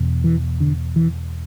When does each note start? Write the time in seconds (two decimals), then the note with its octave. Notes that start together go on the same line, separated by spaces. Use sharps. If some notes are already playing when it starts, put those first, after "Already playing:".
Already playing: E2 B2
0.24 E3
0.60 D3
0.96 E3